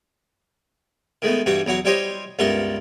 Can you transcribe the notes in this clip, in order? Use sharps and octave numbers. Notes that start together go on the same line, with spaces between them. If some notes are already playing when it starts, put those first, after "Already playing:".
D#3 G#3 A3 B3
G2 E3 G3 F#4 B5
E2 F#3 E4 F#4
G3 E4 G4 C5 C#5 D#5
C#2 G2 B3 A4 A#4 E5